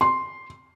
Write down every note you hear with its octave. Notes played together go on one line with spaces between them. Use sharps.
C6